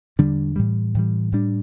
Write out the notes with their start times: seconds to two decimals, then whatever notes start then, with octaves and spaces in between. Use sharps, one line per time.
0.19 E2 D3 G3 D4
0.56 A2 E3 G3
0.95 A2 E3 G3
1.32 A2 G3 D4